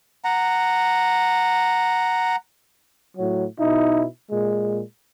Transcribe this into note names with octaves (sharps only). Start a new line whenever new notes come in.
F#5 A#5
A2 F#3
B2 D#4 E4
A#2 G#3